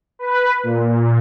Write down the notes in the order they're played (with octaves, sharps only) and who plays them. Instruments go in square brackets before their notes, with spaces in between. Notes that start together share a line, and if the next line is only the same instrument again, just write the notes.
[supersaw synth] B4
A#2